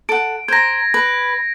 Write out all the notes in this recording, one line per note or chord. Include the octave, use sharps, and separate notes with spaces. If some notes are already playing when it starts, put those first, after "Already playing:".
A4 F#5 D7
C5 A#5 G#6 A#6
B4